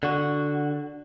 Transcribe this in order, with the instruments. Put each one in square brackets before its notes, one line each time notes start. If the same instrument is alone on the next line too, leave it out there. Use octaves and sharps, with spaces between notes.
[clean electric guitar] D3 F#4